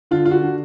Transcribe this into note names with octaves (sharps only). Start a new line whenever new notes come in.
D3 F4
F4
F#4
D3